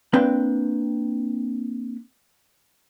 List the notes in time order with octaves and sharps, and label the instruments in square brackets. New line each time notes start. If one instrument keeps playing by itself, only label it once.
[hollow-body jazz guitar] A#3 C4 D4 B4 G5